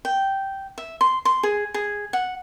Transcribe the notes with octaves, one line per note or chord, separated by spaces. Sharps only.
G5
E5
C6
C6
G#4
G#4
F#5